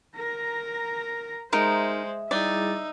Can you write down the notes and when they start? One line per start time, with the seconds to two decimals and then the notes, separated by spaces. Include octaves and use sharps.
0.16 A#4 A#5
1.53 G#3 D#4 A#4 C5 E5
2.31 G3 D#4 E4 G#4 D5 E5